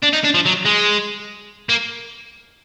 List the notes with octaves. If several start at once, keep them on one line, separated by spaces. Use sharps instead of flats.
D4
D#4
D4
F3
F#3
G#3
A#3